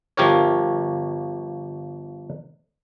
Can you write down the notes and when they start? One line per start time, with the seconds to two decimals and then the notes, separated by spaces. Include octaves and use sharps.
0.17 G1 F3 G4 A#4 C#5